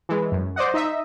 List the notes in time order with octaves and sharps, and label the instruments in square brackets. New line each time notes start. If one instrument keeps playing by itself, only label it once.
[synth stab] E3 G#3
F#2
C5 D5 D#5 F#5
D#4 D#5 E5